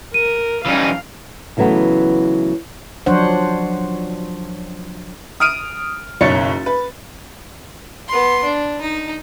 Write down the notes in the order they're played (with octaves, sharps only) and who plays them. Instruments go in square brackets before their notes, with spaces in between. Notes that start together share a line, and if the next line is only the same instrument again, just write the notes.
[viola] A#4 [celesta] D#7
[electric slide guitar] E3 G3 D#4 [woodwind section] C#4 [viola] F5
[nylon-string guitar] C#3 E3 F#3 A3 B3
[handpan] F3 F#3 D4 C5 C#5 F#5
[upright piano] D#6 F6 D7 D#7
F#1 B1 C#5 A6 C#7
B4
[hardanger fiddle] B3 C6
D4
D#4